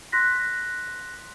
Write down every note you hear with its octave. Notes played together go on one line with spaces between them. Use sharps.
C6 F#6 A#6 B6